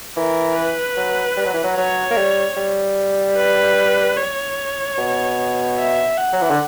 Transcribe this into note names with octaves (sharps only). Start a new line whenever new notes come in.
E3 A#4
B4
F#3
G3
F#3
E3
F#3
F#3 C#5
A#3
G3
G3
B4
C#5
B2
E5
F#5
F#3
E3
D3